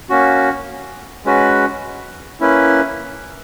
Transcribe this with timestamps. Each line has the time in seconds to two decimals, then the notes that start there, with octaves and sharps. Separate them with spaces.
0.10 A#3 C#4 F#4
1.25 G#3 C#4 F#4 B4
2.40 A#3 C#4 E4 B4